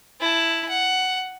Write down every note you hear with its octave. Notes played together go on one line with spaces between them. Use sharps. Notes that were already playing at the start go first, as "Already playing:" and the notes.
E4 A5
F#5